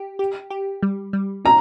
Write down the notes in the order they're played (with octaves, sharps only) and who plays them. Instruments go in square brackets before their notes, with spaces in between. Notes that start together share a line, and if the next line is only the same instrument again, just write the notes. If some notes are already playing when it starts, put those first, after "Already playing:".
Already playing: [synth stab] G4
G4
G4
G3
G3
[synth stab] C#4 [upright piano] A#5